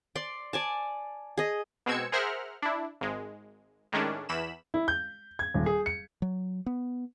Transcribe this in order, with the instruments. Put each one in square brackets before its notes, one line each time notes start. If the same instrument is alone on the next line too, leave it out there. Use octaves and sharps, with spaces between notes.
[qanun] D5 C6
D5 G#5 A5
G#4 D#5
[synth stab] B2 G#3 C4 E6 G#6 C#7
G#4 A#4 C5 E5 F#5 F6
D4 E4
G#1 G#3
A2 D#3 G#3 C#4 D4
E2 E3 B5 E7
[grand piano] E4
G6
G#6
D#1
G#4
C#7
[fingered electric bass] F#3
B3